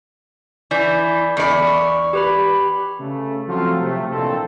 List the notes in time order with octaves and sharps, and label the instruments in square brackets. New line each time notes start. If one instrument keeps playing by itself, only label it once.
[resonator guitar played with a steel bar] E3 [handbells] D5 G#5 G6
[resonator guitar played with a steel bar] E2 D5 [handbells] B5 C#7
[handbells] C#6
G4 B4 B5
[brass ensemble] C#3 A3
F3 F#3 A3 C4 F4 A4
C3 A3
A#1 F2 A#2 E3 C4 A4